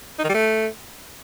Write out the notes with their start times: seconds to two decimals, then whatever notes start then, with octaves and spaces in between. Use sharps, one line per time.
0.19 D#4
0.24 D#3
0.29 G3
0.34 A3